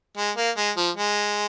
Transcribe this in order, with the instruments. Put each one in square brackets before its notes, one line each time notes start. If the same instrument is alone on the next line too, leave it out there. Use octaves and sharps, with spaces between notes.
[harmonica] G#3
A#3
G#3
F3
G#3